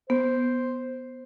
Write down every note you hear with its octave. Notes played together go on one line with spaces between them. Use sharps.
B3 C5